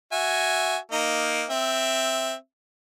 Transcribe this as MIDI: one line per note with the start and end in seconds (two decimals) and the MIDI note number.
0.12 0.77 66
0.12 0.77 76
0.12 0.77 80
0.92 1.45 58
0.92 1.45 63
1.50 2.34 60
1.50 2.34 76